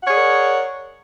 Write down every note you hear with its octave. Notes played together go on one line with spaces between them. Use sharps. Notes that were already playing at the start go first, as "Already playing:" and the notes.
G#4 A#4 C#5 D5 F#5